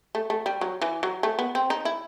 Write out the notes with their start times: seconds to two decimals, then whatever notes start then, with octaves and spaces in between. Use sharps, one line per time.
0.15 A3
0.30 A3
0.46 G3
0.61 F#3
0.82 E3
1.03 F#3
1.23 A3
1.39 B3
1.55 C4
1.70 D#4
1.85 E4